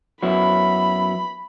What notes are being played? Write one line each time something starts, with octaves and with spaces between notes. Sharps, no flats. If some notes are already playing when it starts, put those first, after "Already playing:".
F#2 F#3 B3 E4 B5